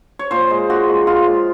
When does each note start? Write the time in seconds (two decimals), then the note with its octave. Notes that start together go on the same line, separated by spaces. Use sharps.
0.19 C#5
0.31 A#2 C5
0.50 G#3
0.70 A#2 F#4
0.89 G#3
1.07 A#2 F4
1.27 G#3